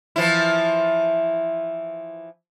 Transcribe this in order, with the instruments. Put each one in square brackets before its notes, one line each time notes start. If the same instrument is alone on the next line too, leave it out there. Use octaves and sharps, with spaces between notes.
[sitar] E3 F3 E4